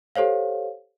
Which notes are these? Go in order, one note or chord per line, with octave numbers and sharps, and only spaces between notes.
G4 A4 C5 C#5 F5